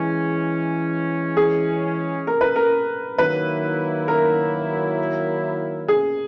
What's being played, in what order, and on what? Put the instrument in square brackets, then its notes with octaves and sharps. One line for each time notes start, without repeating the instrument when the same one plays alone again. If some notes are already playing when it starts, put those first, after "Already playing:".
Already playing: [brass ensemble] E3 G#3 C#4
[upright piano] G#4
A#4
B4
A#4
[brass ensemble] D#3 F#3 A#3 E4 [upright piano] B4
[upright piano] A#4
G#4